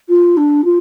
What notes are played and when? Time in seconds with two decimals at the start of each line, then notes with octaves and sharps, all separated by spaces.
0.09 F4
0.37 D4
0.64 F4